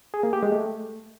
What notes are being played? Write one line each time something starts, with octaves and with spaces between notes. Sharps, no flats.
G#4
A#3
G4
G#3
A3